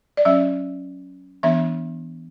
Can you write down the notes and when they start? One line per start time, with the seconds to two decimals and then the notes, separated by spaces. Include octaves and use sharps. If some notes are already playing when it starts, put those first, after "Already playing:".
0.17 D5
0.25 F#3 C#4 E5
1.43 E3 B3 D4 E5